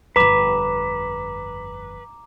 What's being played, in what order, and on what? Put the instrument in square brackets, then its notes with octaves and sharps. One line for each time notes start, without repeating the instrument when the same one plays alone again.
[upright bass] G1 F2 [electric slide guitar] B4 [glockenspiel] A#5 D6 E7